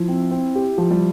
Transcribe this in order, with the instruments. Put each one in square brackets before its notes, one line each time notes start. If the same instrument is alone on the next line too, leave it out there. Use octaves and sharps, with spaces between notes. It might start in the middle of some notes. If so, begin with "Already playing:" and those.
Already playing: [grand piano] F3 [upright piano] E4
[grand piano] C4
C4
G4
F3
[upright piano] G3